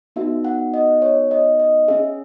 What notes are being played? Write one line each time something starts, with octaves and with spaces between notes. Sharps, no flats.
B3 D#4 F#4 E5
F#5
D#5
C#5
D#5
D#5
C#4 G#4 E5